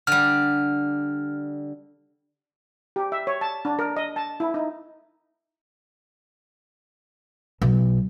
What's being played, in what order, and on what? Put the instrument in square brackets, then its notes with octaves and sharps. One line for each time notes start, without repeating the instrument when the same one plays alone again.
[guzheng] D3 G3 [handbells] F6
[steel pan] G4
E5
C#5
A5
D4
A#4
D#5
A5
E4
D#4
[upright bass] B1